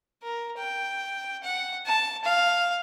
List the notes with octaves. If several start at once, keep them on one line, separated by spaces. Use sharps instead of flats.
A#4
G5
F#5
A5
F5